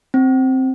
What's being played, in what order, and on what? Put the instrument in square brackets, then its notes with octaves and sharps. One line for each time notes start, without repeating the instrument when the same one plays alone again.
[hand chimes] C4